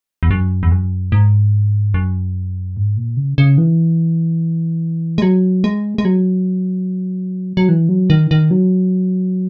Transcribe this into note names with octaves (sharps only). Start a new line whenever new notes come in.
E2
F#2
E2
F#2
G#2
F#2
G#2
A#2
C#3
C#3
E3
G#3
F#3
G#3
G#3
F#3
F#3
E3
F#3
D#3
D#3
F#3